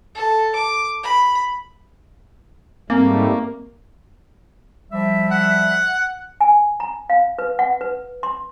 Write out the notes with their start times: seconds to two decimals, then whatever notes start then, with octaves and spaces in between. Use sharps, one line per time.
0.15 A4
0.55 D6
1.03 B5
2.90 G#2 G3 A3 A#3 C4
4.92 F3 G3 E5
5.32 F#5
6.41 G#5
6.80 A#5
7.10 F5
7.39 B4
7.59 F#5
7.81 B4
8.23 C6